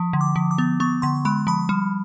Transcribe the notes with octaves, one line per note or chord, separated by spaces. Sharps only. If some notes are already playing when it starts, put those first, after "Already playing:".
Already playing: F3
D3
D6
F3
D6
B3
B3 C#6
D3 C6
G#3 B5
F3 B5
G3